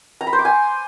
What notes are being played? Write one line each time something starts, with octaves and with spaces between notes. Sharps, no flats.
A#5
B5
C5
D6
G#5